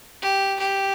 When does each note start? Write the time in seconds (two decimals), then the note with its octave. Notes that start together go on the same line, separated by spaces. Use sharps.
0.22 G4
0.60 G4